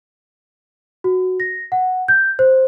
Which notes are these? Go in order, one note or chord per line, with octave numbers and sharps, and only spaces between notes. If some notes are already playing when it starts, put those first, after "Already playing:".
F#4
A#6
F#5
G6
C5